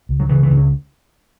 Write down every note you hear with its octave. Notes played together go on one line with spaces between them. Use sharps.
C#2
F#3
C#3 E3
E3
C#2
C#4